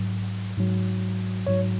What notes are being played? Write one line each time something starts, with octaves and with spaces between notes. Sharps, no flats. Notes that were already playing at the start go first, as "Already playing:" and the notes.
Already playing: G#2 F#3
G#2 F#3
G#2 F#3 C#5